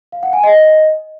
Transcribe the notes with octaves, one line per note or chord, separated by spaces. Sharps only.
F5
F#5
G#5
D#5